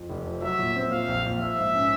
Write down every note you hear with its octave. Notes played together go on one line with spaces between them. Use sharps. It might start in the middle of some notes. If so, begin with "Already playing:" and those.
Already playing: F2
F1
F3
F#3 E5
A#2
C4
A#2 F5
A#1
A#1
F3 E5
G#2
C#4